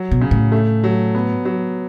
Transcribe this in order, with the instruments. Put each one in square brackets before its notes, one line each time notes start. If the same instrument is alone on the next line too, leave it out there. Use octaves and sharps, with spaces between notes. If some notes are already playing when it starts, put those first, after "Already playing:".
Already playing: [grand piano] F#3
[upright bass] B2
[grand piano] C#3
[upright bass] A2
[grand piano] A3
F#3
B3
F#3